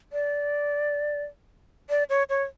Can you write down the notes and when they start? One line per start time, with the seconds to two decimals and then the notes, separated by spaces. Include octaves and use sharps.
0.13 D5
1.90 D5
2.09 C#5
2.29 C#5